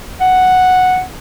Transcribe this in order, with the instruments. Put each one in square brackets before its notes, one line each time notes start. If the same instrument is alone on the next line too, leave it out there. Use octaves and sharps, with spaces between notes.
[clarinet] F#5